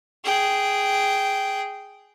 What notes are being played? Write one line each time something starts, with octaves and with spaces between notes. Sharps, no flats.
G#4 G5